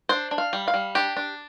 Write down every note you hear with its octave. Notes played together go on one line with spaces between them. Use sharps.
D4 C5
D4
F5
G3
F5
G3
D4 G4
D4